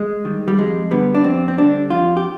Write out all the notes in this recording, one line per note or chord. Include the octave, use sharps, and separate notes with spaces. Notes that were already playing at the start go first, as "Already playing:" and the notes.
Already playing: G#3
D#3 G3
G3
F2 G#3
D3 G3 B3
D4
F2 C4
C4
D3 G3 D4
F2 F4
G4